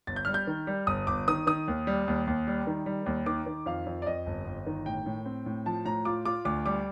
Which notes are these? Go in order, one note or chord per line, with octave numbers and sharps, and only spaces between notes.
G1 A6
G6
G3 F6
G6
D#3
G3
G1 D#6
G1 D6
D#3 D#6
D#3 D#6
D#2
G3
D#2
D#2
G3
D#3
G3
D#2
D#3 D6
D#3
F2 F5
F2
D5
F2 D#5
G1
G1
D#3
A2 G5
A2
C4
A2
F3 A5
A2 A#5
F4 D6
F4 D6
D2 D6
G3 D6